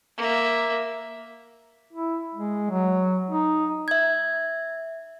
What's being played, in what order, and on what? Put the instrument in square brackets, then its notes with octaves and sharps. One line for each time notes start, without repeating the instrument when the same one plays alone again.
[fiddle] A#3 E5
[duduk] E4
G#3
F#3
D#4
[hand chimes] E5 G#6